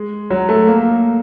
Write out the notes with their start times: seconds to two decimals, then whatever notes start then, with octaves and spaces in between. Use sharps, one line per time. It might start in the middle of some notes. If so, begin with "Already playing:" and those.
Already playing: G#3
0.30 F#3
0.49 A3
0.67 A#3